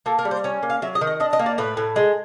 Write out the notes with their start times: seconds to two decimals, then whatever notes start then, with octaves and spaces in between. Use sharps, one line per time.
0.06 A#3 A4
0.19 A#4
0.25 G3
0.31 C5
0.44 C#4 C#5
0.63 A#3
0.70 F5
0.82 F#3 E5
0.95 D#5
1.01 D#3
1.07 D#5
1.20 D4 D#5
1.33 D#5
1.39 A#3
1.46 D5
1.58 A2 B4
1.77 A2
1.96 G#3